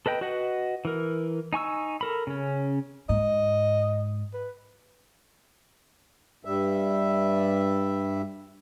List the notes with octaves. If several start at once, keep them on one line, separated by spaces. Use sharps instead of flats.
A4 B4 D#5 G5
F#4 B4 D#5 F#5
E3 A#4
D#4 G#5 C#6 E6
A4 A#4 B5
C#3 C#4
G#2 D#5
B4
G2 G3 E5